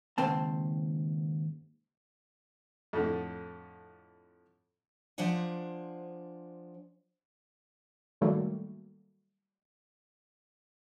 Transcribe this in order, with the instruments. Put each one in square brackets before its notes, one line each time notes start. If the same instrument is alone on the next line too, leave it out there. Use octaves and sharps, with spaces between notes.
[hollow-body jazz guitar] D#2 G#2 C#3 C4 A5
[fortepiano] F2 A2 D3
[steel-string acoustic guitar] F3 D4 C5 D5 F#5 G#5
[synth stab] A2 D#3 F#3 G3 A3 A#3